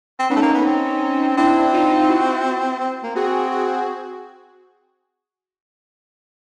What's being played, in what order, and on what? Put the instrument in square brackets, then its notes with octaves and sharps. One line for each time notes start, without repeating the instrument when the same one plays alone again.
[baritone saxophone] C4
[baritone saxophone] B3 [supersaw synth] C#4 D#4
[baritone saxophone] A3
A#3
B3
C4
[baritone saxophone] C4 [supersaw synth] D4 E4
[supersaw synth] D#4 F4
E4 F#4
[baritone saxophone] C4
A#3
[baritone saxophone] C4 [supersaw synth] F#4 G#4
[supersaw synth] F#4 G#4